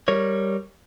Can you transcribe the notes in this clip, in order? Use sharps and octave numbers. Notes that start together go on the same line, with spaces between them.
G3 A#4 C#5